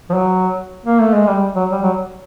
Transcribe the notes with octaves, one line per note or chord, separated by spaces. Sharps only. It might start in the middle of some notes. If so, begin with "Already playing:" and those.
F3
F#3
A#3
A3
G#3
G3
F#3
G3
F#3